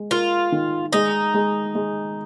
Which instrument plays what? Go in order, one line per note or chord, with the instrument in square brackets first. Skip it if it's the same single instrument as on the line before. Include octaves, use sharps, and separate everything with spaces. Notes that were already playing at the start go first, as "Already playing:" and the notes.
Already playing: [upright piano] G#3
[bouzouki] F4 [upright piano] A#4
[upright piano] D#3
[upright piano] G#3 [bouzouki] D#4
[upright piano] G#3
G#3